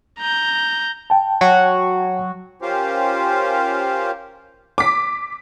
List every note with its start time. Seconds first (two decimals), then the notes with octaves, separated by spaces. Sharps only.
0.19 A#5 G6
1.10 G5 A5
1.41 F#3 F#4
2.62 C#4 F4 G4 A#4 C5 F5
4.78 D6 B6